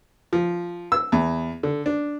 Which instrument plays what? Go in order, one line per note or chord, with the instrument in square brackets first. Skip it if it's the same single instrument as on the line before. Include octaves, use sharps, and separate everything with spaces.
[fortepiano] F3
E6
E2
D3
D4